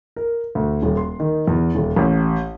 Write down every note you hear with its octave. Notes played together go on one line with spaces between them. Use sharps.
A#4
D2
D#1
C6
D#3
E2
D#1
A1